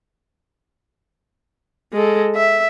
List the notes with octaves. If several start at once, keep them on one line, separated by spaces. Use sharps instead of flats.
G#3 A4
E5